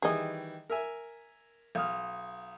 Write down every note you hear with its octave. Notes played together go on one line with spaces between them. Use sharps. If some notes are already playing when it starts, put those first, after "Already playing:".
D#3 E3 G3 G#4 D#5
A#4 E5 G#5
B1 F5 D#6 F6